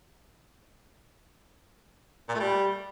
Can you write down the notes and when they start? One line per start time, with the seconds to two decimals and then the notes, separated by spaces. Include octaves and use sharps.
2.29 A#2
2.34 A3
2.40 G3